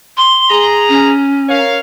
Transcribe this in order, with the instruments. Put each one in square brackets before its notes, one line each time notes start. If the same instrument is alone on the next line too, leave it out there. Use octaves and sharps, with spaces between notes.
[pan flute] C6
[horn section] G#4 A#5
[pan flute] C#4
[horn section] A#4 C#5 F5